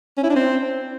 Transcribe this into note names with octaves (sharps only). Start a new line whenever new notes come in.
C#4
E4
D4
C4